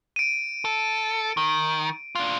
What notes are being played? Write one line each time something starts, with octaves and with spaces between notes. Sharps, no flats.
D7 D#7
A4
D#3
D4 F4